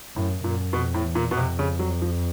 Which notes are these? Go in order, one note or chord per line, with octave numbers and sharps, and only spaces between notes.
F#2 A2
F#2 A#2
F2 B2
A2
E2
A#2
F2 B2
C3
C#3
F#3
F3